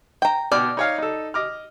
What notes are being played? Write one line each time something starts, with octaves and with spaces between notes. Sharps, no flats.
G5 A#5
B2 D5 G5 F6
D#4 C#5 F5
D#4 A4
D#5 D6 F6